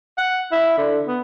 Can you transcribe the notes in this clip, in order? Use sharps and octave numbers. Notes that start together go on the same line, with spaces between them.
F#5
E4
D3
B3